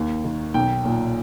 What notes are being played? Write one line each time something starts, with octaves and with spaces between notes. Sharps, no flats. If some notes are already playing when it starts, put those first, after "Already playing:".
Already playing: D#2
D#3
B1 G5
A#2